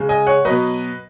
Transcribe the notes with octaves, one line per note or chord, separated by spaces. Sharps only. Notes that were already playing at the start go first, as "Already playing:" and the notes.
Already playing: C#3 G#3
D#5 G#5
C#5 F#5
B2 F#3 B4 D#5